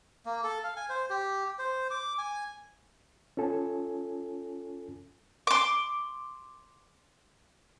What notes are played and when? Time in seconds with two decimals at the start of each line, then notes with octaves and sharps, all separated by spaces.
0.26 A#3
0.44 A4
0.64 F5
0.76 G#5
0.89 C5
1.10 G4
1.59 C5
1.91 D6
2.18 G#5
3.37 C#4 F4 A4 G#5
5.47 C6 D6